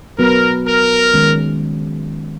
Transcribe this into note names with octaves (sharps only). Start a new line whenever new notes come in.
F#3 B3 F#4 A#4 B4
A#4
D#3 G#3 C#4